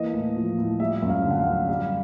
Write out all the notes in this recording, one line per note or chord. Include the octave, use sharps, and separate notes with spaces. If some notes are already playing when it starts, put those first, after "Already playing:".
Already playing: E3 A#3 D#5
A2
F3
A2
G3 E5
F#2
F5
D3
F#5
F5
F#2
G3 F5